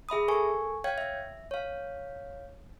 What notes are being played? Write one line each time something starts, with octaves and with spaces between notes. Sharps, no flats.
G#4 E5 B5 D#6
A4 A#4 G#5 C#6
C#5 F5 G5 G#6
E5
C#5 F5